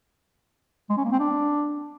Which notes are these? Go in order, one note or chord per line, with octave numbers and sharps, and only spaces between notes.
G#3
C#4
A#3
C4
D4